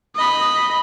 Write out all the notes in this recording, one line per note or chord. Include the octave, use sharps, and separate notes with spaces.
D#5 B5